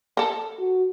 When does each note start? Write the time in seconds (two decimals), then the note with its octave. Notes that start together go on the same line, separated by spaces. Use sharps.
0.17 A4 A#4
0.59 F#4